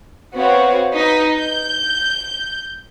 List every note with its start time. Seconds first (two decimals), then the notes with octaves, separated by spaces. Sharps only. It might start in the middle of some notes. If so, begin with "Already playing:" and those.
0.35 B3 C4 F#4 C#5 F5
0.93 D#4 B4 D#5 B6
1.36 G6